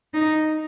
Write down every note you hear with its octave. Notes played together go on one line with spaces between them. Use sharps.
D#4